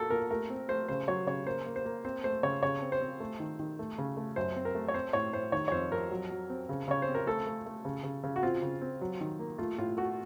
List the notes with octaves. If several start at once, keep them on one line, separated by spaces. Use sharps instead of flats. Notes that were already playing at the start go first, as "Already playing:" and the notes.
Already playing: A#2 A#3 F#4 A4
A#2 A#4
A3 A#4
C4
A3 C5
C#3 C5
F#3 C#5
C#3 C#5
A#3 C5
A#3
C5
A#3
C4 C5
A3 C5
C#3 C#5
C#3 C#5
C4
C5
C4
A3
D#3
D#3
A3
C#3
A3
F#2 C5
C4
A#4
A3
C#5
C4 C5
A2 C#5
A2 C5
D#3 C#5
C#5
F2 C5
F2 A#4
F#3
F#3
C4
C#3
C#3 C#5
C5
C4
A#4
A3 A4
A3
A3
C#3
C#3
C#3
F#4
C4 F4
C#3
C4
F#3
D#3
A#3
A3 F4
A2 F4
A3 F#4